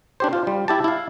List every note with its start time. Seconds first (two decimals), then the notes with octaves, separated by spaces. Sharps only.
0.20 D4 G4 C5
0.33 F4
0.47 G3
0.68 E4 G4 A5
0.84 E4 F5